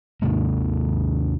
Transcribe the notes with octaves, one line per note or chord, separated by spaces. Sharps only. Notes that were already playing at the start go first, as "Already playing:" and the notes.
D#2 C3 G#3 A#3